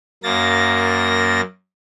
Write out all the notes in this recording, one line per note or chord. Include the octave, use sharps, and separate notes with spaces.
F#2 A#3 A6 A#6